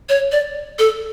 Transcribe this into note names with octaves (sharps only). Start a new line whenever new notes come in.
C#5
D5
A4